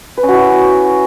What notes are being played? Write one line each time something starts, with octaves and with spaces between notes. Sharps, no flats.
B4
C#4
F#4
E4